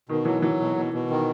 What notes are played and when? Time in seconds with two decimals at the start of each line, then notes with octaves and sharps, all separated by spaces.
0.09 B2 D#3
0.25 E3 F#3
0.42 E3 F#3
0.60 B2
0.77 B2
0.94 B2
1.10 D#3